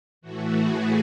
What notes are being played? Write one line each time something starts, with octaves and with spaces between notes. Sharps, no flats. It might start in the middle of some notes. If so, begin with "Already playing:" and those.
A2 E3 A3 F#4
G#4